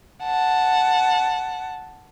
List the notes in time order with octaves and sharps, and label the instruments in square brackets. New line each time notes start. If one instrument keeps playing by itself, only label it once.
[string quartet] F#5 A5